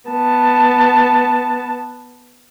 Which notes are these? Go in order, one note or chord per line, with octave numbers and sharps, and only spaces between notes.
B3 A5